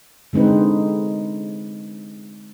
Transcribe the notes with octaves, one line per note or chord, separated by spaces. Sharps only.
D3 G#3 C4 D#4 B4